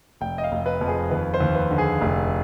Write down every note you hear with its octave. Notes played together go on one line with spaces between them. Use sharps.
F1 G5
D#5
F5
F1
B4
F2
G#4
D#2 B4
C5
D#2
B4
D3
G#4
F1